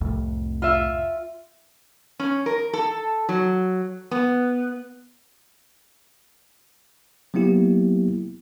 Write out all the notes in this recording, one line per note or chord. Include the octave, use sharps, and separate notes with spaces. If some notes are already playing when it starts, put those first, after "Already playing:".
C2 F2 A2
F4 E5
C#4
A#4
A4
F#3
B3
F#3 A#3 B3 E4 G4